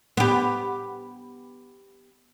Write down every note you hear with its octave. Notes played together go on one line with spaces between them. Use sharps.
B3 G4